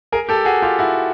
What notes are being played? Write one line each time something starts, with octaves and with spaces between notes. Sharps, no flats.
G#4 A#4
G4 A4
F#4 G#4
F4 G4
E4 F#4